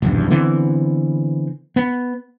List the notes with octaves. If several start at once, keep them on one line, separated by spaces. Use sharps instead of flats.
D#1 B1 E2 G2
D3 E3 B3 C4
B3